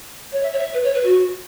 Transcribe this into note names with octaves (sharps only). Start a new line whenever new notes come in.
C#5
E5
C#5
E5
B4
C#5
B4
F#4